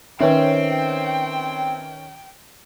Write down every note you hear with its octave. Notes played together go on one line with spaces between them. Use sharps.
D#3 C4 C#4 B4 C#5 E5 G5